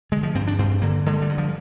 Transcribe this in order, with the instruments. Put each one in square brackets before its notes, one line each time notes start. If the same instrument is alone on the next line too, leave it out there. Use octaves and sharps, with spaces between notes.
[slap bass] D3 G#3
F3
G2 C4
D4
G2 C4
D3 A#3
D3 G#3
G3
G2
F3